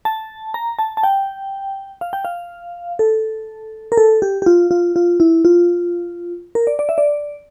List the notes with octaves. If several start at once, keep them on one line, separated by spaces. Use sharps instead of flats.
A5
A#5
A5
A5
G5
F5
G5
F5
A4
A#4
A4
G4
G4
F4
F4
F4
E4
F4
A#4
D5
D5
E5
D5